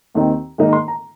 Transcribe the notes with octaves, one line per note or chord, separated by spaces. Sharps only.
D#2 D#3 C4 D#4
G#2 D#3 A#3 D#4
A#5
C6
A#5